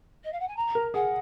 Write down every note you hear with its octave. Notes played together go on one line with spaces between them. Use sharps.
D#5
F5
F#5
G#5
A#5
A#4
G#4 F#5